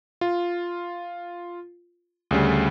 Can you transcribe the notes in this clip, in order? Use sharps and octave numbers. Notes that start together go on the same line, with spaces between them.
F4
D2 C#3 G3